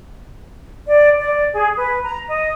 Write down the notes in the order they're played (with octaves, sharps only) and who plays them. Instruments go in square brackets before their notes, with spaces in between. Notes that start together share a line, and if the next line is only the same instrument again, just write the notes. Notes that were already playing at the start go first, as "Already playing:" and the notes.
[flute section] D5
D5
G#4
B4
A#5
D#5